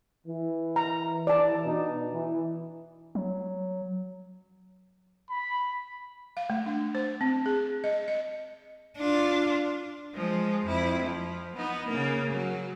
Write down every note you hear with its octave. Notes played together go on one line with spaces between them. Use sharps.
E3
A#5
E3 D5 A5
B2 D4 D#4
E3
F#3
B5
F5
A3
D4
C5
C4
G#4
D#5
D#5
D4 F4
F3 G#3
F2 E4
F3
B3 D#4
C#3 A#3
F#3